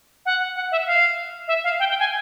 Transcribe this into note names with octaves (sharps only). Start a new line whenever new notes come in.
F#5
F#5
E5
F5
E5
F5
G5
G5
G#5